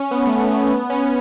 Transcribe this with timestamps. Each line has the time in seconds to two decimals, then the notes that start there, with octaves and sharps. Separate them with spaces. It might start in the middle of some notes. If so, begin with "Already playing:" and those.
Already playing: C#4
0.11 B3
0.27 A3
0.31 B3
0.44 A3
0.58 B3
0.70 B3
0.90 C#4